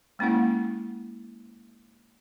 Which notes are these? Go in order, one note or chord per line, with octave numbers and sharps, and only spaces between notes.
G#3 A#3 C#4 E4 F#5